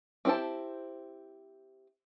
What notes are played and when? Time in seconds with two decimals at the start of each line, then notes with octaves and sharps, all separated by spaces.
0.25 C4 E4 G4 C5 A5